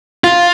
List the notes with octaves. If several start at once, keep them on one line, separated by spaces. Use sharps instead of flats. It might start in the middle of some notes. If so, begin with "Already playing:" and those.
F4